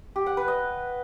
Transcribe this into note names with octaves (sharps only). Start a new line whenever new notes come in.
G4
F#5
B4
D#5